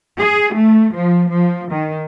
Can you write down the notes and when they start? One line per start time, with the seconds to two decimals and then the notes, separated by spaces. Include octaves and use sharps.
0.19 G#4
0.54 A3
0.94 F3
1.31 F3
1.72 D#3